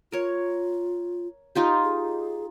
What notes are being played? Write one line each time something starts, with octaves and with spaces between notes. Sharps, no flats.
F4 A#4 C#5
D#4 F4 G4
G#4